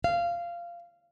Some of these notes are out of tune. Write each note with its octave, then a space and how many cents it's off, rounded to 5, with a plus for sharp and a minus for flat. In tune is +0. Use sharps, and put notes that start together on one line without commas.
F5 -15